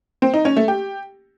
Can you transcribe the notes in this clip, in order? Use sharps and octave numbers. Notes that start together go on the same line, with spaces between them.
C4
D#4
C#4
A3
G4